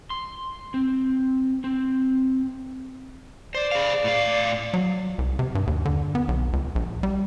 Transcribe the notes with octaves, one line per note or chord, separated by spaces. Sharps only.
C6
C4
C4
C5 D5
G#4 F5
A2 F5
F#3
C2
C3
G2
D#2
D3
B3
B1
C#2
A#1
G3